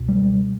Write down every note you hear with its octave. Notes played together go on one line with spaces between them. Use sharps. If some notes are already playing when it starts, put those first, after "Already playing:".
Already playing: C#2 B2
G3